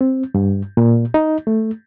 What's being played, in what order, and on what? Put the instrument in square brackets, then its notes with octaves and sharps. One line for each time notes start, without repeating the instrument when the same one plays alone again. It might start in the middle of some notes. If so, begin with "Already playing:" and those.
[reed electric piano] C4
G2
A#2
D#4
A3